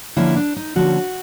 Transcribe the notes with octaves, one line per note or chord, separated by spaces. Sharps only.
D3 F3 A#3 C#4 E4
D4
D#4
D3 F3 A#3 C#4 F#4